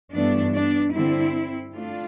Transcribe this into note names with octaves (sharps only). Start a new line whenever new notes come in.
G2 E3 A3 B3 D4
B3 D4
G2 D3 G3 C4 E4
A3 D4 F4